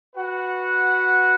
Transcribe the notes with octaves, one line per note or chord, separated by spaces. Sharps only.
F#4 B4 F#5